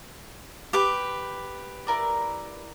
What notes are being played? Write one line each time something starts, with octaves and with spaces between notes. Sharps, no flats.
G4 B4 D6
E4 A#4 D5